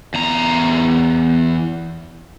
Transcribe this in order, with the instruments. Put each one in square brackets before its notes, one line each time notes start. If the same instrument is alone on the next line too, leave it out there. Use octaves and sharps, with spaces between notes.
[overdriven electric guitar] E2 A#5